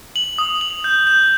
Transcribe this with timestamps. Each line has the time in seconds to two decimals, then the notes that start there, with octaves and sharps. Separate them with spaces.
0.16 F#7
0.38 D#6
0.61 F#7
0.84 G6
1.07 G6